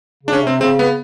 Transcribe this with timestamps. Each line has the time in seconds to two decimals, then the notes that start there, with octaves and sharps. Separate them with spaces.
0.23 C#3 D4
0.33 C#4
0.42 C3 C4
0.60 C#3 C4
0.79 B3